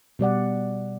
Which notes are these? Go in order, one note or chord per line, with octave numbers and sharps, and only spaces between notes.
B2 G3 D5 F#5